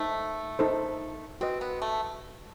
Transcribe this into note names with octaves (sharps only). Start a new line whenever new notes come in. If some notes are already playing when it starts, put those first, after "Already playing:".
Already playing: A3 D#4 A4 C5
D#4 A4 C5
C4 F#4 B4 D#5
B3
A3